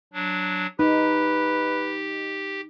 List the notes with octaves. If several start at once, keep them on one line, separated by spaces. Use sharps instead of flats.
F#3 D4
D#4 G4 B4